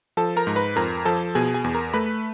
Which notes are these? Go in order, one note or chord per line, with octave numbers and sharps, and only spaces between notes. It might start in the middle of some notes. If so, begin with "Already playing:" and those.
F3 A4 A5
A#4 A#5
G#2
B4 B5
F2 A#4 A#5
F3 A4 A5
B2 G#4 G#5
G#4 G#5
E2
A#4 A#5
A3 B4 B5